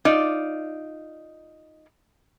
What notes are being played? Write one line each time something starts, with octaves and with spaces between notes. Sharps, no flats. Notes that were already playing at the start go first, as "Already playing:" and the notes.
D#4 F4 D5